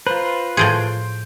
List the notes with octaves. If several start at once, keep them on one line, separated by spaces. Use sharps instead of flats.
F4 B4 C5 A#5
A2 F3 G#4 C6 G6 D7